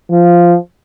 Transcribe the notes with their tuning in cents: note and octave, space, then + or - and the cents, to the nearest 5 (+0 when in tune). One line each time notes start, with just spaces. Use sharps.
F3 -5